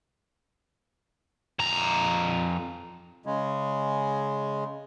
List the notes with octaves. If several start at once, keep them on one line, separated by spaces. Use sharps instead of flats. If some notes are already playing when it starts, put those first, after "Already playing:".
F2 A#5
C#3 G#3